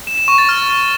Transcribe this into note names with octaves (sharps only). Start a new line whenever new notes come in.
E7
E7
C#6
A6
F6